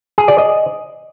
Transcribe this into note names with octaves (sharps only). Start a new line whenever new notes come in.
G#4
D5
D#5